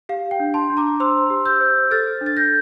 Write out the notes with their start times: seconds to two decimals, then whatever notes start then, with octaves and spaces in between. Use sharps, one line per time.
0.09 G4 F5
0.31 G5
0.40 D4
0.54 A5 C6
0.70 D4
0.77 A#5 D6
1.00 C5 C6 E6
1.30 G4
1.45 E6 G6
1.60 C5
1.91 A4 F6 A6
2.21 D4
2.26 A6
2.37 G6 A#6